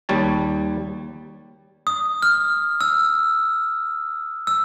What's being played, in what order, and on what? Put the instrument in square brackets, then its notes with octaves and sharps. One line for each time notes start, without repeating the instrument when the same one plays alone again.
[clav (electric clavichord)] D#2 G3 C#5 A5
[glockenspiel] D#6
F6
E6
E6